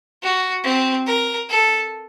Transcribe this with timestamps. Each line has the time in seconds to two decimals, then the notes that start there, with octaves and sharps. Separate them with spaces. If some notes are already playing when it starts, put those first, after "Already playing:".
0.22 F#4
0.64 C4
1.06 A#4
1.49 A4